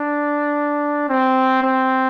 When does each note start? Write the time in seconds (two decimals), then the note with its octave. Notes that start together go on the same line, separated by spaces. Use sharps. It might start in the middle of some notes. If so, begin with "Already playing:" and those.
Already playing: D4
1.09 C4
1.63 C4